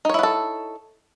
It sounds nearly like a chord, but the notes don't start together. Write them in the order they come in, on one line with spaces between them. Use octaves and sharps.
D#4 C#5 E4 B3 A4